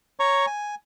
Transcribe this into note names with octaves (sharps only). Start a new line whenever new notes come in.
C#5 A#5 C#6
G#5